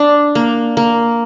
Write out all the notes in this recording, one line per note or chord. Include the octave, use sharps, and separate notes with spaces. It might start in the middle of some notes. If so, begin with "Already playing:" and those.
Already playing: D4
A#3
A#3